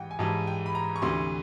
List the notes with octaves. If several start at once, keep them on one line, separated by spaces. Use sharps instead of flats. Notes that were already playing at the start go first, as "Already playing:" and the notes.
Already playing: G#2 E3 G3 F#5 G5
G#5
G#2 E3 G3 A5
G5
B5
A#5
C#6
D2 C3 E3 G3 C6